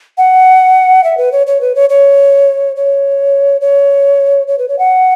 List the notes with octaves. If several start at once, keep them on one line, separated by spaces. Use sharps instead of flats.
F#5
E5
B4
C#5
C#5
B4
C#5
C#5
C#5
C#5
C#5
B4
C#5
F#5